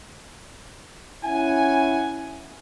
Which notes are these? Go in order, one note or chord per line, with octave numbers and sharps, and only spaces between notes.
C#4 E4 F#5 G#5